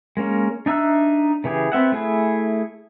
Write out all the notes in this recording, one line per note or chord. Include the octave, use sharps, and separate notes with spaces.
G#3 A#3 C#4
D4 D#4 E5 E6 F#6
C#3 E3 G4 G#4
B3 C4 E5 F#5
A3 E4 G#4